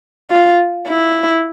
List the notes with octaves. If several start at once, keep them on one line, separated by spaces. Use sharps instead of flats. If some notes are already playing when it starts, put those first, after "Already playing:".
F4
E4